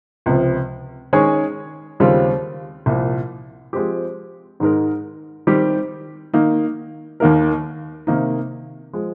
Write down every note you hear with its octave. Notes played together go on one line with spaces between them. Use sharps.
C#2 C3 F3
D#3 G#3 C#4 G#4 C#5
D#2 C#3 G3 C4 F4
C2 A#2 F3
F3 G#3 C4 G4
G#2 D#3 G#3 D#4 A#4
D#3 G3 C4 G4
D#3 A#3 D#4
D#2 D#3 A#3 D#4 A#4
C3 D#3 A#3 D#4
F3 G#3